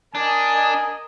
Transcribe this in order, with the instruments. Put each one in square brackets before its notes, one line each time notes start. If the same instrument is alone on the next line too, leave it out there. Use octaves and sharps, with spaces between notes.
[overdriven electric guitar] D4 [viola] A#4 D#5 [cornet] G#5